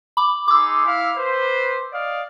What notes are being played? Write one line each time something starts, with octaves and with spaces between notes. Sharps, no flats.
B5 D6
D#4 G#4 C6 D6 E6
E4 F5
B4 C5
D5 D#5 F5